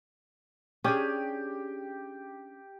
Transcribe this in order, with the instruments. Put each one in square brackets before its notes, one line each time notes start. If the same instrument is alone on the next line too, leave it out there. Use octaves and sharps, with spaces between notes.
[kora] C#4 D4 G#4 [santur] G4